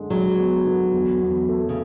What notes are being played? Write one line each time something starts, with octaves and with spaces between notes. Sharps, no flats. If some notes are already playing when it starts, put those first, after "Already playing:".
Already playing: F#2 D3 G#3
F#3 G#3
B3
D3
E2
E2
A3
C#3